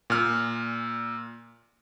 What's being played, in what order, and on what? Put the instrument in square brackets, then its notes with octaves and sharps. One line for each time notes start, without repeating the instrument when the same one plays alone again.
[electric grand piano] A#2 F6